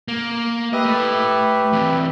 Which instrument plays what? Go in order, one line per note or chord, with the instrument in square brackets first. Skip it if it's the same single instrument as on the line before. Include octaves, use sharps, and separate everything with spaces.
[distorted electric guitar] A#3
[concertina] G4 B4 E5 [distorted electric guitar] D#5
[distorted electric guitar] A3 B5
E3 C4